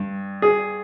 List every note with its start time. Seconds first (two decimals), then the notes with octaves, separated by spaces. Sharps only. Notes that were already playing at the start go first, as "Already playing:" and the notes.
Already playing: G2
0.42 G#4